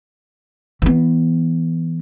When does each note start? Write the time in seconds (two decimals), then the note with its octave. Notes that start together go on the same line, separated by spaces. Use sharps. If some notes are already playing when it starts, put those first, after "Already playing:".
0.82 E3 B3